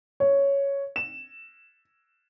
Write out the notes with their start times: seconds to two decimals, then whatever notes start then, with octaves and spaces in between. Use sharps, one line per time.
0.20 C#5
0.96 E7